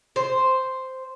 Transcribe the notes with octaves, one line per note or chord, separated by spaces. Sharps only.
C5